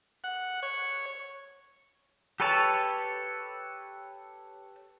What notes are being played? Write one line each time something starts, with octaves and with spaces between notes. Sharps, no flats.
F#5
C#5
G4 A4 B4 C#5 A5